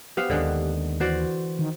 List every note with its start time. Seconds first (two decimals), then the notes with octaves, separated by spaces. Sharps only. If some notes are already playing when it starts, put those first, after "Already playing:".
0.17 B3 G4 C5 F5
0.30 D#2 D3 G#3 B3
1.00 E3 F#4 C5 D5
1.59 D#3